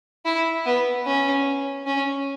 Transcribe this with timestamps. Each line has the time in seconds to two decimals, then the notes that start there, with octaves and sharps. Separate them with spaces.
0.25 E4
0.66 B3
1.06 C#4
1.86 C#4